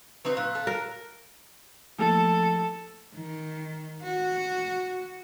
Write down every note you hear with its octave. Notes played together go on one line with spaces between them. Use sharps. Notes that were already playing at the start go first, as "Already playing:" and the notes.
F#3 C4 D#4 B4
A#2 F5 F#6
A4
A#4
F3 A3 A#3 A4
D#3
F#4